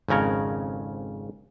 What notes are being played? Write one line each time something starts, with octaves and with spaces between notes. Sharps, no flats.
G#1 F2 C#3 A#4 C#5